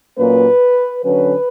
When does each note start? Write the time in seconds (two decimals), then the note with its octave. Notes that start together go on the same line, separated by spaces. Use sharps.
0.17 A#2 F#3 A#3 C#4 B4
1.03 D3 F#3 C#4 B4